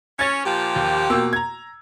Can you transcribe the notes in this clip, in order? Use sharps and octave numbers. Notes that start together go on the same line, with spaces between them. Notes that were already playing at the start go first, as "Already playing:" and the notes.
C#4 C#5 G#6 A6
A#2 F3 G4
D#2
B2 A#3 E6
A#5 G#6